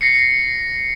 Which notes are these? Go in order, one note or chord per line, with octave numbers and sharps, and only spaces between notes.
A#6 C7 C#7